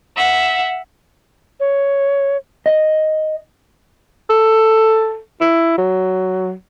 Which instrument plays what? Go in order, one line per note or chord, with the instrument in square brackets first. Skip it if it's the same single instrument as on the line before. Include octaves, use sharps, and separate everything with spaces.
[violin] E5 F#5
[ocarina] C#5
[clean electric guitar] D#5
[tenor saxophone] A4
E4
F#3